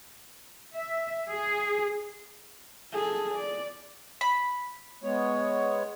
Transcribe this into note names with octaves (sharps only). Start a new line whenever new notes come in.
E5
G#4
G#4 A4
D5
B5
G#3 B3 C#5